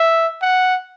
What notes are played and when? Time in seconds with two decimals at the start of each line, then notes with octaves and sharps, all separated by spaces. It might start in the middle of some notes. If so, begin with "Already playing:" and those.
Already playing: E5
0.42 F#5